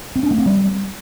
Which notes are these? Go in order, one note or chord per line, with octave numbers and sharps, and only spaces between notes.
C4
D4
A3
C4
G3